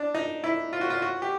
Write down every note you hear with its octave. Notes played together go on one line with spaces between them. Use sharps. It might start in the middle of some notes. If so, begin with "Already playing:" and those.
Already playing: D4
D#4
E4
F4
F#4
F4
F#4
G4